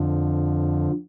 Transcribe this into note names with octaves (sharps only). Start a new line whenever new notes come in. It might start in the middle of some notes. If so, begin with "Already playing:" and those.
Already playing: F2 D3 F3